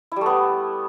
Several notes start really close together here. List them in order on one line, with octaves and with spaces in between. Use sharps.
E4 G3 A3 B3